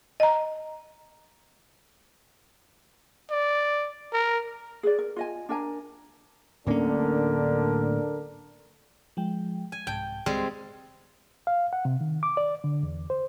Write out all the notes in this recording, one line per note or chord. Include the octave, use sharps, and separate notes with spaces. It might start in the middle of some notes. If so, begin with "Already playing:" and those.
D#5 A#5
D5
A#4
G#4 B4 D5
A#4
F4 D#5 G#5
D4 A#4 G#5 A#5
D1 A2 D3 A#3 C#4 D4 A#4
F3 G#3 G5
G#5
C2 G#2 G5 A5
C#2 G3 G#3 C4 C6
F5
F#5
C3
D#3
D6
D5
D3
E2
C5